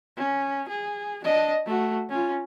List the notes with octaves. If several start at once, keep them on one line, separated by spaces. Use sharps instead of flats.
C#4
G#4
D4 D#5
A3 F#4
C#4 F4